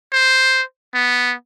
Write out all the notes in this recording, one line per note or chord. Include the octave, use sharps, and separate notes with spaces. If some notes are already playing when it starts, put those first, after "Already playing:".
C5
B3